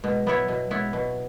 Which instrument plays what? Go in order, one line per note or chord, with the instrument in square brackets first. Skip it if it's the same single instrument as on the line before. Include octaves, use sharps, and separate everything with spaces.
[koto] B2 [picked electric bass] G#3
[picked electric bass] F#3 [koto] B3 E4 C#5
[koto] B2 [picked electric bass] F#3
[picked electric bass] G#3 [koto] B3 E4 C#5
[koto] B2 [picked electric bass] F#3